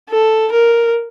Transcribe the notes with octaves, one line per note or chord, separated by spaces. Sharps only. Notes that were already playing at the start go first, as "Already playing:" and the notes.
A4
A#4